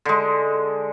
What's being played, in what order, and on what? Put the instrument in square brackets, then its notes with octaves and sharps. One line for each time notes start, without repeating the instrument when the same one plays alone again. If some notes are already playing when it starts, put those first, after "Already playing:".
[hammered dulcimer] D3 G#3